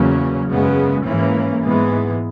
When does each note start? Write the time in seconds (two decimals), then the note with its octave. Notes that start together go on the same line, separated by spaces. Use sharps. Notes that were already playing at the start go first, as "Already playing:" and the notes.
Already playing: E2 C#3 F#3 A#3 C#4
0.50 F#2 C#3 G#3 B3
1.07 G#2 E3 A#3 C#4
1.64 G#2 E3 G#3 B3